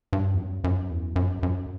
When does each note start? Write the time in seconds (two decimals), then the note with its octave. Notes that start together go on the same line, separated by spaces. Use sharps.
0.13 G2
0.34 E2
0.38 F#2
0.64 F#2
0.90 E2
1.16 F#2
1.43 F#2